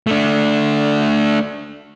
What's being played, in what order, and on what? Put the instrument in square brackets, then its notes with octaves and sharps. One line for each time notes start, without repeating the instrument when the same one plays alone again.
[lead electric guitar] A3 D4